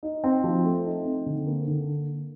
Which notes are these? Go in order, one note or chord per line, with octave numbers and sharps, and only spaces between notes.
D#4
C4
F3
A3
D#4
C4
D3
A#3
D3